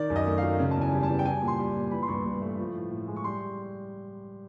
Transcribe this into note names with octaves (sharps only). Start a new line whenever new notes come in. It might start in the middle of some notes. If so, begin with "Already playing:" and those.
Already playing: D#3 D5
F#2
D#5
A3
F5
F#3
C#3
E2 A5
G#5
G3
A5
E3
G5
G3 G#5
A#2
C6
G3
A#2
E3 B5
C6
G2 C#6
G2
A3
F3
A2
A2
G#3
C#6
G3 C6